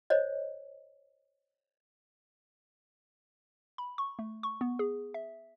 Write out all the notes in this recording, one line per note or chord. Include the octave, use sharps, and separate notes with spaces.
C5 C#5 D#5
B5
C#6
A3
C#6
B3
G#4
E5